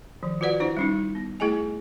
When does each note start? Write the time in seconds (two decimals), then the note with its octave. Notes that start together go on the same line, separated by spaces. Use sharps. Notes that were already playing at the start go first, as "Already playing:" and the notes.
0.23 D#3 F3
0.41 F4 F#4 B4 D5 F#5
0.60 D4 E4 C5
0.77 G3 C#4 D#4
1.15 B3
1.40 A3 E4 G#4 D#5 G#5